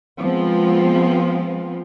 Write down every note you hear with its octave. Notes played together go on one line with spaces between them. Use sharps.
F3 G#3 B3 C4 F4